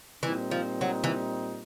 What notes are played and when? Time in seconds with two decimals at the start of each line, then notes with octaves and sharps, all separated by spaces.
0.22 A#2 E3 G3 C4 D#4
0.51 F3
0.81 F#3
1.04 E3